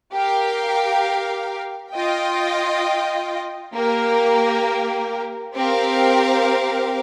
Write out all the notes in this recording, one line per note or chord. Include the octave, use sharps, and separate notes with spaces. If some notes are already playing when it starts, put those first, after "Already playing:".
G4 A#4 F5
F4 D#5 G5
A#3 G4 A#4
C4 G4 A#4 F5